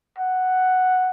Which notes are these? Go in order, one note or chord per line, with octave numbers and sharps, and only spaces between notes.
F#5